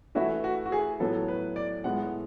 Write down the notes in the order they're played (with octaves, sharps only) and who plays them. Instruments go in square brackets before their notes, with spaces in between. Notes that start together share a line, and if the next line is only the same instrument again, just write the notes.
[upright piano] E3 A3 E4 B4 E5 [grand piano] F#4
[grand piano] F#4
F#4
G#4
[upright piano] A2 F#3 B3 [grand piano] A4
[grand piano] B4
D5
[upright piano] A2 G#3 B3 E4 [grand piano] F#5